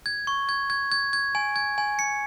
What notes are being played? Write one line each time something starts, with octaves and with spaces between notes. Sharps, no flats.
G#6
C#6
G#6
G#6
G#6
G#6
G#5
G#6
G#5
C#7